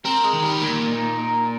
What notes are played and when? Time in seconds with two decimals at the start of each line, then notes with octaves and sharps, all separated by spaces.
0.05 C4 A#4
0.24 G#3
0.33 D#3
0.42 G3
0.61 A#2 A#3
0.90 D#4
1.18 A#4